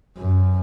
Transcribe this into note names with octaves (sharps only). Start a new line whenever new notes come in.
F#2